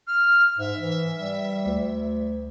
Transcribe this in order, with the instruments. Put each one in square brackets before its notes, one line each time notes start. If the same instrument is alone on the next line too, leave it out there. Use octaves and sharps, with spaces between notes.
[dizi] F6
[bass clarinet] G#2 [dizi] E5
[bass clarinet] E3
G3
D2